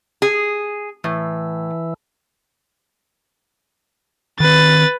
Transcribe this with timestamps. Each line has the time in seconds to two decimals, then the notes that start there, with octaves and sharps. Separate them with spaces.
0.22 G#4
1.04 A2 E3
4.40 D#3 C4 B4 A6